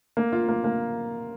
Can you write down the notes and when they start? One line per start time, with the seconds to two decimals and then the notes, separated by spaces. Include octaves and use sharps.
0.17 A#3
0.32 F4
0.49 A#3
0.64 A#3